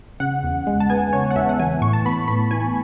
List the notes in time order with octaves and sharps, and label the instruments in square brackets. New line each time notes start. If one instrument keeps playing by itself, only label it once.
[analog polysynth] C#3 F#5
E2
G#3
A5
B3 G#5
C#3 C#5
F#5
E2 E5
F#5
E3 G#5
A2 C#6
A5
B3 B5
A2 B5
E3 G#5